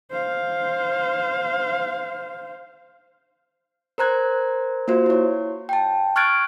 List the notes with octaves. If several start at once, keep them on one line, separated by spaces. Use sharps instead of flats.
C5 F5
A#4 C5 A#5 F#6 G#6
A#3 F4 F#4 C5
E4 C#5
G5 A5
C#6 F6 F#6 G#6 A6 D7